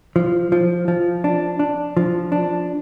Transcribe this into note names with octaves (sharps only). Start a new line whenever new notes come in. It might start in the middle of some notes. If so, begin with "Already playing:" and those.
F3
F3
F3
D4
D4
F3
D4